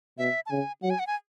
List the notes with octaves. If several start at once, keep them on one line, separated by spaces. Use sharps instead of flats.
B2 E5
A5
C#3 G#5
F#3 F#5
G#5
F#5
G#5